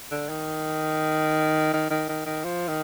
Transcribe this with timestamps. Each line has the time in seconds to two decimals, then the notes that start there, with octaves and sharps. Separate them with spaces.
0.11 D3
0.29 D#3
1.73 D#3
1.90 D#3
2.09 D#3
2.26 D#3
2.44 F3
2.68 D#3